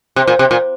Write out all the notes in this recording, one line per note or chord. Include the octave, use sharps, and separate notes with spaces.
C3
A#2
C3
A#2